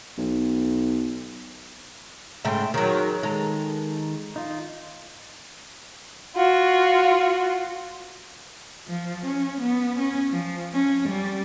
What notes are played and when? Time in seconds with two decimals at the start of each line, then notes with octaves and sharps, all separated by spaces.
0.18 B1
2.45 G#2 C#3 A3 E5 G5 C6
2.74 D#3 F#3 G#4 A#4 C#5
3.23 D#3 G#3 A4 A#5
4.36 D#4 F4
6.36 F4 F#4
8.88 F3
9.25 C#4
9.61 B3
9.99 C#4
10.30 F3
10.73 C#4
11.09 G3